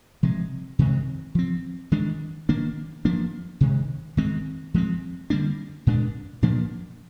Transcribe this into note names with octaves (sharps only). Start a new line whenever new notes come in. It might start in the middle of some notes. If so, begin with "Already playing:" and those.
C3 F3 G#3
C3 D#3 G#3 C4
F3 C4
D#3 G#3 D4
D#3 A#3 D4
F3 A#3 D4
C3 D#3 G#3
D#3 G#3 C4
F3 G#3 C4
D3 G3 A#3 D4
A#2 G#3 D4
A#2 F3 A#3 D4